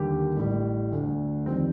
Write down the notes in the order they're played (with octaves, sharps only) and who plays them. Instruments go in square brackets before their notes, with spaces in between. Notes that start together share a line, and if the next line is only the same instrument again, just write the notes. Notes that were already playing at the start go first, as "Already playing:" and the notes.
Already playing: [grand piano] D#2 D3 G3 G4
A1 A2 G3
D2 D3 A3
F2 D#3 G3 C4